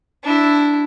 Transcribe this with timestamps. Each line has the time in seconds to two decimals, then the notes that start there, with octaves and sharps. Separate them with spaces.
0.24 D4 E4